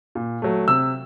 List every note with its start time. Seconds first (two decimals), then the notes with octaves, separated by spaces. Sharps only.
0.15 A#2
0.42 F#3 A3
0.68 C3 E6